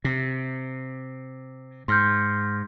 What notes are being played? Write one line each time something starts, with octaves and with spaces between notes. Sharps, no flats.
C3
G#2 C6 F6 G6